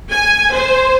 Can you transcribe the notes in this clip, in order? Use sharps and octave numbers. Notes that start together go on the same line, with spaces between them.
G#5
C5